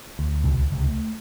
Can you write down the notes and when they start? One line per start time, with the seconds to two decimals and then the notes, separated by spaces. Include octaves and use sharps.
0.19 D2
0.44 C2 B2 D3
0.72 C#2 C3
0.88 A3